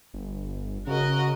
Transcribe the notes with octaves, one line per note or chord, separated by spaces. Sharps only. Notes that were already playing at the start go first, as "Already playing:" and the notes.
G1
C#3 F#4 A#4 D#5